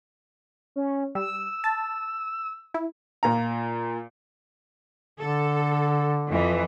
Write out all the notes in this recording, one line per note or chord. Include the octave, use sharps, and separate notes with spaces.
C#4
G3 E6
A5
E4
A#2 F4 A#5
D3 A4
F2 E3